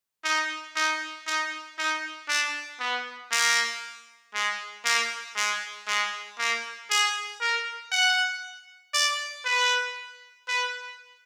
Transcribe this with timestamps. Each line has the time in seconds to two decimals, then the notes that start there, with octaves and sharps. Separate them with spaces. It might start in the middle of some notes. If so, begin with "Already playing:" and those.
0.24 D#4
0.76 D#4
1.27 D#4
1.78 D#4
2.28 D4
2.80 B3
3.31 A#3
4.34 G#3
4.85 A#3
5.36 G#3
5.87 G#3
6.38 A#3
6.90 G#4
7.41 A#4
7.92 F#5
8.94 D5
9.45 B4
10.48 B4